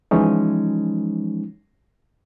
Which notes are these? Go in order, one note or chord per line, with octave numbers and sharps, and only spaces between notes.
E3 F3 G#3 C#4 D#4